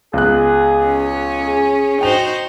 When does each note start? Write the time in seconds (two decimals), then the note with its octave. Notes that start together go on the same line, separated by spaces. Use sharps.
0.13 C#2 B3 G#4 F#6
0.86 C#4
1.41 G#4
2.01 D#4 F#4 C5 G5 F7